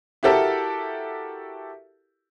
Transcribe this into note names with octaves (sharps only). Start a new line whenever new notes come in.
E4 F#4 G4 A4 A#4 E5